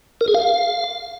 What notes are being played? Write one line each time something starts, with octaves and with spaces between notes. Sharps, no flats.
A#4
G#4
F5